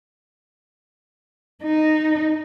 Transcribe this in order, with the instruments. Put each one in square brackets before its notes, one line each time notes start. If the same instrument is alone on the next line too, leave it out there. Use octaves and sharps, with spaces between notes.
[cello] D#4